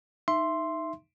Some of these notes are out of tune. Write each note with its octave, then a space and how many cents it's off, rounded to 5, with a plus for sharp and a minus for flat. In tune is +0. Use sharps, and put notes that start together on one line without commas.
D#4 +0 E5 +15 C6 +0